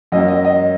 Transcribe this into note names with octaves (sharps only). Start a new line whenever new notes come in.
F#2 F#3 A#3 D#5
D#5
D#5